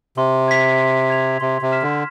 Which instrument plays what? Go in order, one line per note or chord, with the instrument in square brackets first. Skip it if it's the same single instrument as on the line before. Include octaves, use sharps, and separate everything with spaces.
[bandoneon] C3 [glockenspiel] C6
[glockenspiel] G#6 B6 F7
C6
G#6 B6 F7
[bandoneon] C3 [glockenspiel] C6
[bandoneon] C3
[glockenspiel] F6 B6 E7
[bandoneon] D3